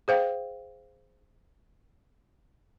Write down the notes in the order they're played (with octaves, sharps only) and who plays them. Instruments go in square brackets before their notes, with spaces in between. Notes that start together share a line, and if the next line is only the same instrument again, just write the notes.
[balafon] G#4 C5 F5 G5